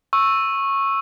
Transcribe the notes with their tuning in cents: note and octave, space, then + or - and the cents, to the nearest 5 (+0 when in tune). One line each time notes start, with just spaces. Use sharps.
C#6 -15 E6 +0